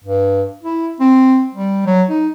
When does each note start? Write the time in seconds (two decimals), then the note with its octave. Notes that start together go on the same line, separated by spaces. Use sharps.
0.04 G2
0.63 E4
1.00 C4
1.55 G3
1.86 F#3
2.09 D#4